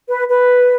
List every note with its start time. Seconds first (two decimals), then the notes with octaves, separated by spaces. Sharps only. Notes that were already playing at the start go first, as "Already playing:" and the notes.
0.08 B4
0.28 B4